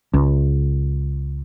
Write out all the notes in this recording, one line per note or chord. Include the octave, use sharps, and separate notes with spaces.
C#2